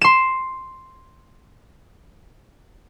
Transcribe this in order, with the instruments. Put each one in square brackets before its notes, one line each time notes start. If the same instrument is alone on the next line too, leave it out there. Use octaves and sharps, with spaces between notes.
[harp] C6 E7